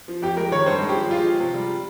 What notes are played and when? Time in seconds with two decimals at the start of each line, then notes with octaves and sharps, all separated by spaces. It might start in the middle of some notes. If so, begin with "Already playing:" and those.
0.08 F3
0.22 F2 G4
0.37 G#3 A#4
0.51 D#3 C#5
0.66 G2 C5
0.81 G#3
0.89 G4
0.96 F3
1.11 G#3 F4
1.26 F3
1.40 C3
1.54 G3